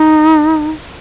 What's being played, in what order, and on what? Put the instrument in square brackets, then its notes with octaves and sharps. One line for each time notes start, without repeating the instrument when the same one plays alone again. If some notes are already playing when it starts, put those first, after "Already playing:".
Already playing: [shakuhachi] D#4